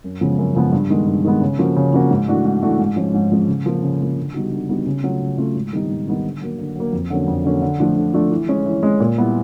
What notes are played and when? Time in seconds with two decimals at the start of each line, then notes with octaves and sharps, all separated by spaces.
0.04 F#2
0.21 C#3 F3 G#3 B3
0.38 F#2
0.55 C#3 F3 G#3 B3
0.72 G2
0.90 D#3 G#3 B3
1.07 G2
1.24 D#3 G#3 B3
1.41 C#3
1.59 F3 A#3 C#4 F#4
1.76 C#3
1.93 F3 A#3 C#4 F#4
2.11 G#2
2.28 E3 A3 D4 F#4
2.45 G#2
2.62 E3 A3 D4 F#4
2.79 G#2
2.96 F3 G#3 C#4
3.14 G#2
3.32 F3 G#3 C#4
3.48 C#3
3.66 F3 A#3
3.82 C#3
4.00 F3 A#3
4.17 D3
4.34 G3 B3 D#4 F#4
4.52 D3
4.69 G3 B3 D#4 F#4
4.86 C#3
5.03 F#3 A3 C#4 F4
5.21 C#3
5.38 F#3 A3 C#4 F4
5.55 G#2
5.73 D#3 G3 B3 D#4
5.90 G#2
6.08 D#3 G3 B3 D#4
6.24 D3
6.41 F#3 A#3
6.58 D3
6.76 F#3 A#3
6.93 F2
7.10 D3 F#3 A#3 C#4
7.28 F2
7.44 D3 F#3 A#3 C#4
7.62 D3
7.80 F3 A3 D4 F4
7.96 D3
8.14 F3 A3 D4 F4
8.31 E3
8.48 G#3 C#4
8.66 E3
8.83 G#3 C#4
9.00 A#2
9.18 G3 B3 E4